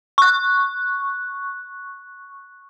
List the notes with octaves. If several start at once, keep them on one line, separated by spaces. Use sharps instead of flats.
C#6 F#6